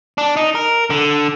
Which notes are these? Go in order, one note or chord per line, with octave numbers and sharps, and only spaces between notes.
D4
D#4
A#4
D3